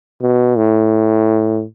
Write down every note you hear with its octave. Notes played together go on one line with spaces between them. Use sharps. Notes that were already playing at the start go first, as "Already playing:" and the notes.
B2
A2